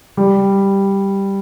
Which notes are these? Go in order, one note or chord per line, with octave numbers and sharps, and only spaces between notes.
G3